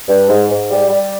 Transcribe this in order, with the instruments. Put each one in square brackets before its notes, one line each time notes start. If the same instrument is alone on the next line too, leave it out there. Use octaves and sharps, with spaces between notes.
[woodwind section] G2
G#2
G#2
G3
G3